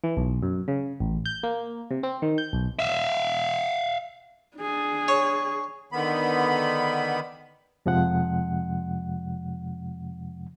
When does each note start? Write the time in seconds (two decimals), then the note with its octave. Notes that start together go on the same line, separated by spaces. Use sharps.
0.04 E3
0.17 B1
0.43 F#2
0.68 C#3
1.00 A1
1.26 G6
1.43 A#3
1.91 C3
2.03 C4
2.22 D#3
2.38 G6
2.53 B1
2.79 E5 F5
4.57 D4 G#4
5.08 C#5
5.92 D3 D#3 B3 B5
7.86 F2 C3 F3 G#3 F#5